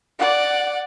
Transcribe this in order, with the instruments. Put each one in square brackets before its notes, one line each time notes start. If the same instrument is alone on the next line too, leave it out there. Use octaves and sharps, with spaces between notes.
[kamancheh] D5 F#5